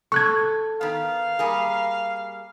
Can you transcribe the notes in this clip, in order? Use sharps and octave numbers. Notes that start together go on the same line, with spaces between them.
A4 C#6 F#6 G#6
D#3 B3 F5
G3 A#3 G#4